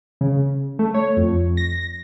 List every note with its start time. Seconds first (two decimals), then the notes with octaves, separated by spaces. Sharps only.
0.21 C#3
0.79 A3
0.94 C#5
1.17 F2
1.57 A#6